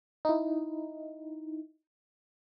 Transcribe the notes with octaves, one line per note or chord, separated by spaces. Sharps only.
D#4 E4